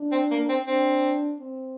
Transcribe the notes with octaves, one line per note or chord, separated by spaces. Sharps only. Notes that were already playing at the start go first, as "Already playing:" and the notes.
Already playing: D4
C4
A#3
C4
C4 D4
C4